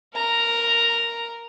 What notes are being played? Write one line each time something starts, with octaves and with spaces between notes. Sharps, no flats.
A#4 A#5